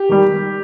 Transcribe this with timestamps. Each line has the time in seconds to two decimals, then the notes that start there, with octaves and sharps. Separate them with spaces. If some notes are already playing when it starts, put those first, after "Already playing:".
Already playing: G4
0.09 D#3 G3